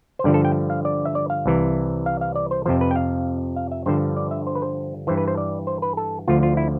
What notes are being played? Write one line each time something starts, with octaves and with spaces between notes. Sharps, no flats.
C5
G2 D3 F3 D5
A4
G5
F5
D5
E5
D5
F5
C2 C3 E3
F5
F5
D5
C5
F2 C3 F3 C5
B4
G5
F5
F5
E5
G2 D3 F3 C5
D5
E5
C5
B4
C5
G2 E3 C5
B4
C5
D5
C5
B4
A4
D2 D3 F3 F4
F4
E4